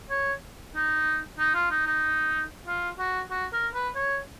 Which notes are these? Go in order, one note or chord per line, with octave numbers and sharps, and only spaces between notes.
C#5
D#4
D#4
F4
D#4
D#4
F4
F#4
F#4
A#4
B4
C#5